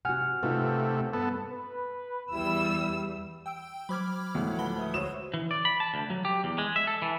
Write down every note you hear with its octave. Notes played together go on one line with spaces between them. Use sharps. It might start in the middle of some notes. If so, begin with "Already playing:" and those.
C3 F#4 F#5 G#5 F6
C3 A3 D#4 F4 B4
G2 B3 A4
B4
E2 G3 E4 E6
G5 E6 D7
F#3 C5 B5 D6 F6 G#6
D2 A2 G#3
F3 B4 F#5 A5 B5 G7
E5 D#6
F#4 C5 C#5 D#6 E6 E7
E3
D5
B5
A5
D2
F#3
G4
E2
G#3
E5
A4
E3